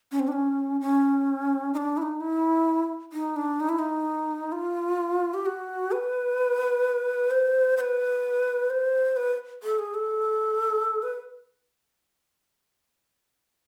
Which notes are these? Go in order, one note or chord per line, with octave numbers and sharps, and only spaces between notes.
C#4
C4
D4
C#4
C#4
D#4
D4
E4
D#4
E4
D#4
D4
D#4
E4
D#4
F4
G4
F#4
B4
C5
C5
B4
C5
B4
A4
G#4
A4
B4